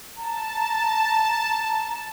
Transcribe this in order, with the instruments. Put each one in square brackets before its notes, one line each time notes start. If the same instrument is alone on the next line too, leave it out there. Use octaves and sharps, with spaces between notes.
[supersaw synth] A5 [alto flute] A#5